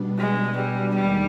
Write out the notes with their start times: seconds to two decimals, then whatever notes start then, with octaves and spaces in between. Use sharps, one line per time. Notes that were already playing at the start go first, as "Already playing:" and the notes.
Already playing: B2 G3 B3 D4
0.18 G#3
0.57 G3
0.95 D#2 D#3 G3 G#3